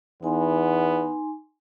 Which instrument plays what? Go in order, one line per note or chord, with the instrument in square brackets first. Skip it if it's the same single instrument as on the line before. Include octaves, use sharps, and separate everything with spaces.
[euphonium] E2 [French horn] B3 [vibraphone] D#4 G#5 C6